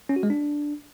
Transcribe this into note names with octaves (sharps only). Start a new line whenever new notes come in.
C#4
F#4
G#3
D4